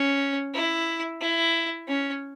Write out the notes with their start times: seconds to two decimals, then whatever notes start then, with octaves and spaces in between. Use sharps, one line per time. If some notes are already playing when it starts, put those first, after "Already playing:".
Already playing: C#4
0.54 E4
1.21 E4
1.87 C#4